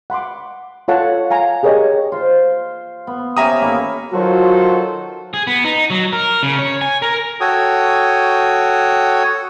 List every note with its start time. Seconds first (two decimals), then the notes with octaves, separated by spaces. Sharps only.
0.10 F#5 B5 C6 D6
0.88 F4 A4 C#5 F5 F#5 A5
1.31 F5 G#5 A#5
1.63 G4 G#4 A#4 C#5 D#5
2.12 F4 C5
3.07 B3
3.37 C#4 G4 E5 A#5 D#6
3.62 A#3 E4 A4
4.13 D#3 F#3 F4 F#4 A4 C5
5.34 G#4
5.47 B3
5.65 D#4
5.90 F#3
6.13 A#4
6.43 C#3
6.59 C#5
6.81 G#5
7.02 A#4
7.41 F#4 A4 C#5 G5 D#6